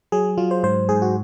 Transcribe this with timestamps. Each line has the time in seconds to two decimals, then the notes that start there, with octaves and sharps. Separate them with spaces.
0.12 F#3 G#4
0.38 F#3 F4
0.51 C5
0.63 G#2 C5
0.89 G#2 G#4
1.02 F#4